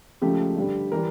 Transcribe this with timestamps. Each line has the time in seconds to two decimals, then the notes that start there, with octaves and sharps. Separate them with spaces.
0.22 C#2 C#3 F3 A3 G4
0.56 G2 D3 G3
0.92 E3 G3 A#4